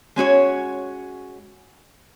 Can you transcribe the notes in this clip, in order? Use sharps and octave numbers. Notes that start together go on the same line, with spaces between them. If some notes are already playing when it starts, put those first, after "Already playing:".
G#3 C#4 F#4 C#5